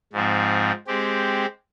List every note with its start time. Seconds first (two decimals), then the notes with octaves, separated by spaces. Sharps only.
0.13 G#2 F3 C4
0.87 G#3 C4 G4